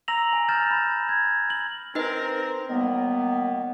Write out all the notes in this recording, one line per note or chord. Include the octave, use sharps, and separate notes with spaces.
A#5 E6 A#6 F7 F#7
G#5
F6 G6 A6 E7 F7
B5
G#6
F#7
C4 D#4 A#4 B4 D#5
D#3 F#3 G3 A#3 B3